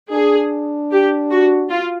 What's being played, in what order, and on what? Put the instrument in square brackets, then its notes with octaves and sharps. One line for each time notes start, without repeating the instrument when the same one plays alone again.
[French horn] D4 [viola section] G#4
[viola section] G4
F#4
F4